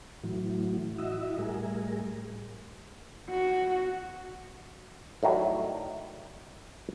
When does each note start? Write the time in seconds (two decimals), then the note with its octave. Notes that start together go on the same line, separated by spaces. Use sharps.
0.24 A2 E3 F#3
0.99 E4 F#4 D#5 E5
1.38 A2 G3 G#4 A#4
3.30 F#4
5.23 A2 D#3 F#3 G3